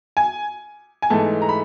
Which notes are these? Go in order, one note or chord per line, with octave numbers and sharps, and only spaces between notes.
G#5
G#5
G#2 E3 A3 A5
A#5
B5